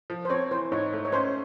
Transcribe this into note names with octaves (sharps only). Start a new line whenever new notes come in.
F3
C5
C4 C#5
E3 C5
G#2 C#5
A3
C#5
C#4 C5